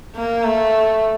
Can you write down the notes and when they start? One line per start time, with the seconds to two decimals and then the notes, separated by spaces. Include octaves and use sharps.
0.16 A#3
0.44 A3